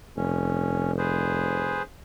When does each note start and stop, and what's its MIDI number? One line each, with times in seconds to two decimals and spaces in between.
0.17 1.83 29
0.17 0.92 61
0.98 1.82 68
0.98 1.82 71
0.98 1.82 72